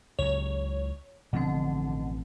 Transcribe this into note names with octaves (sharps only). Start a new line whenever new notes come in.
C#2 F#3 C#5
A1 B2 D3 F3 C4